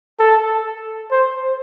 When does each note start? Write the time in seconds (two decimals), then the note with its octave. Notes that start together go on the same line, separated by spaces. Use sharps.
0.19 A4
1.11 C5